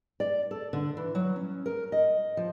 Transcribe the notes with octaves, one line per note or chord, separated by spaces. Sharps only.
D5
A4
D3
E3
F#3
C#4
A#4
D#5
F3